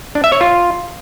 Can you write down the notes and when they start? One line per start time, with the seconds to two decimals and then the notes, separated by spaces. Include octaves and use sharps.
0.15 D4
0.24 E5
0.32 C#5
0.41 F4